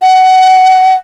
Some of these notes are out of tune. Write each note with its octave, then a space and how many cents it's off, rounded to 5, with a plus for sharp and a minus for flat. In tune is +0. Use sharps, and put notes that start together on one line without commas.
F#5 +20